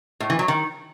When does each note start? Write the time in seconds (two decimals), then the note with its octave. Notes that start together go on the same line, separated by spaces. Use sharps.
0.20 A2
0.30 E3
0.39 F#3
0.48 D#3